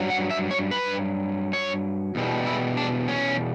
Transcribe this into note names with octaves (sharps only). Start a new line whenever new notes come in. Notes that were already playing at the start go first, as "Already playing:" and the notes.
Already playing: G2 F#3
F#5
E5
C#5
B4
C#5
E2 B2 G3
E4
D4
C#4